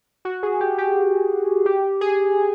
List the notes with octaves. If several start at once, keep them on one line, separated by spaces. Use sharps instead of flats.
F#4
G#4
G4
G4
G4
G#4